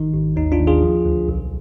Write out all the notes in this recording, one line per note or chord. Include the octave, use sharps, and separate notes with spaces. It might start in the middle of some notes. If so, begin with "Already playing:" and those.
Already playing: G#1 D#3 D#4
G#1
D#2 D#4
D4 F4
D#2
F4 G#4
F3
D2
B1